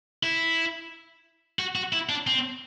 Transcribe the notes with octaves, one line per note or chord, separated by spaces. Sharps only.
E4
F#4
F#4
E4
D4
C4